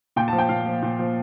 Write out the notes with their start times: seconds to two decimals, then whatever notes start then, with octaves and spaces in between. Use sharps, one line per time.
0.16 A#2 G5
0.28 A5
0.33 F3
0.38 G5
0.49 A#2 F5
0.66 F3
0.82 A#2
0.99 F3